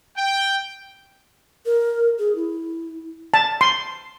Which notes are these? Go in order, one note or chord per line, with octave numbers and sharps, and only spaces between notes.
G5
A#4
G#4
E4
A5
C6